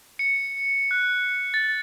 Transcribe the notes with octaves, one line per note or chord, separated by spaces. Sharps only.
C#7
F#6
A6